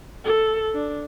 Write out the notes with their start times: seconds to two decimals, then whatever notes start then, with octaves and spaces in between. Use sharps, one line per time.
0.24 A4
0.74 D4